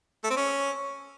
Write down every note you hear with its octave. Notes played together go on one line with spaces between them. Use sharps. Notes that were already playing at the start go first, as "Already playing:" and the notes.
A3
C4
C#4